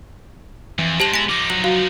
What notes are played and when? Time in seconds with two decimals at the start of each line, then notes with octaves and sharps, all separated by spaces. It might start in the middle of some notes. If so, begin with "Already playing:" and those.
0.79 F2 E3
1.00 G2 G#3 G4 C5 A5 F#7
1.14 G#3 B3 E4 A#6 D7
1.29 F3 D#4 D6
1.50 F#3 F#7
1.64 F#4 F5